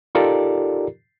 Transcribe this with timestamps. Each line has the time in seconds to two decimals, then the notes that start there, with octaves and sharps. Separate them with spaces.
0.15 D#4 F4 G4 A4 A#4 D5